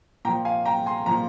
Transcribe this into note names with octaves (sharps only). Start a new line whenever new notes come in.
A#2 F3 G5 A#5
F5 G#5
G5 A#5
G#5 C6
A#2 F3 A#5